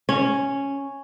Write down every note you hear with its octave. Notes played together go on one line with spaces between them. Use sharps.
C#4